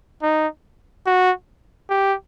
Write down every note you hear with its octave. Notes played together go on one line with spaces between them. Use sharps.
D#4
F#4
G4